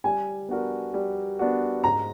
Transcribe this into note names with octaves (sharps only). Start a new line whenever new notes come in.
G3 G#5
B3 D4 F#4 A#4
G3
B3 D4 F#4 A#4
G#2 A#5